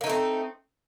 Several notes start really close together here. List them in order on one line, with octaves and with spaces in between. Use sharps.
A#3 D#4 A3 C4